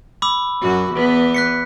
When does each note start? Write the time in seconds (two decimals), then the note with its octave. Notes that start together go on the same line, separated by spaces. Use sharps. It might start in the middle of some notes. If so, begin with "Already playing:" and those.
0.22 B5 D6 E6
0.62 F#2 F#4
0.92 E2 B3
1.34 F#6 B6 C#7